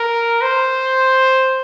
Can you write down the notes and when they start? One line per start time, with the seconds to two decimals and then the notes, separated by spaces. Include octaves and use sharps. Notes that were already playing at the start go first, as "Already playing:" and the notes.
Already playing: A#4
0.42 C5